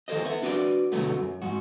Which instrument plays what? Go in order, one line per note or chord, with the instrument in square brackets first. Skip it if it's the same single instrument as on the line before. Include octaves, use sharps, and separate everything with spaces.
[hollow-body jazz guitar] D#3 A4 A#4 C5 D#5
B3 E5
D4 F#4 B4 C#5 D5
B2 D3 F#3 A3 B3
F#2
G#2 F#4